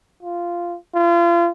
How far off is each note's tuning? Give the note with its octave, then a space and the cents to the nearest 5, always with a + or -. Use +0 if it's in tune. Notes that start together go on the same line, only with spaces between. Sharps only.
F4 -10
F4 -35